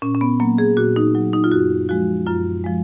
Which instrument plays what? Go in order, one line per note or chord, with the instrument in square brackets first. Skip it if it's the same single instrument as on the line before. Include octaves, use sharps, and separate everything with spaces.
[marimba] A#2 C#4
C#4
B3
F#3 A#3
G#4
A#2 F#4
D#4
F#3
D#4
F4
F#2 F#4
F3 G#3 F#4
F#2 F4
F3 G#3